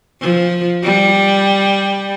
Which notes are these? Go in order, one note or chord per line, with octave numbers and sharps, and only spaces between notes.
F3
G3